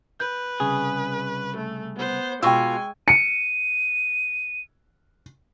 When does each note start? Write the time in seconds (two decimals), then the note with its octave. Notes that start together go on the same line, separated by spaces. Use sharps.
0.20 B4 G6
0.60 C2 C#3 G#4
1.57 A3
1.97 B3 C5
2.43 B2 G#3 F4 G5 G#5 C#6 E6
3.08 C#7 D#7